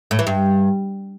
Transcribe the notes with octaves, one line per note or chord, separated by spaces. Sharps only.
A2
E3
G2